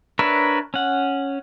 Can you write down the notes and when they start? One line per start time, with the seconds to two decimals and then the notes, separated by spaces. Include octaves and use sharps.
0.19 D4 A#4 B4 C#5 E5
0.74 C#4 F#5